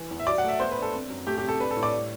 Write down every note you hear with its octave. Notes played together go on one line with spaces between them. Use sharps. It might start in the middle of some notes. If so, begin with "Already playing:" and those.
Already playing: E3
E2
E5
F#3 D5
F#5
A3 E5
B3 C5
B4
D4
A4
C4
F#2
A3 G4
G4
C3 A4
D4 B4
A4
A2
D5
G3